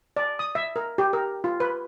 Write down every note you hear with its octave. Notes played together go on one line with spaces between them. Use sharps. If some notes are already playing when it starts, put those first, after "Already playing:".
D5
D#6
E5
A#4
G4
A#4
F4
B4